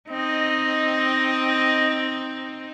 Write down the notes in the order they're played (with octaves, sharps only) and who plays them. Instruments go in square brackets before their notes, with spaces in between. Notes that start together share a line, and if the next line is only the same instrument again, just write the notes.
[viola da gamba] C4 D#4 [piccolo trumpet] D#5